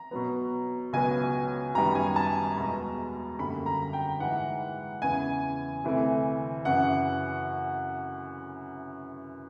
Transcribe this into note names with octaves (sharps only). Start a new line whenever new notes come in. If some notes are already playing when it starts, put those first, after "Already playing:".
Already playing: A#5
B2 F#3 B3
C#2 B2 F#3 B3 G#5
F#2 D#3 G3 B3 A#5
G#5
A5
E2 B2 G#3 A#5
F#2 D3 G3 A#3 B5
A#5
G5
G#2 E3 G#3 F#5
E2 C#3 E3 G#5
D2 C3 E3 A3
F#2 C#3 E3 F#5